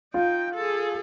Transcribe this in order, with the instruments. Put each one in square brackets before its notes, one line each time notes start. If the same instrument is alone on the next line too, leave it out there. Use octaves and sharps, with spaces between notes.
[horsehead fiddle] D#4 G5 [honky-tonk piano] F4
[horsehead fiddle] G#4 A4